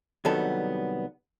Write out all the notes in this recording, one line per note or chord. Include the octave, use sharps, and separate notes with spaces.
C2 D#3 F#3 G3 B3 A4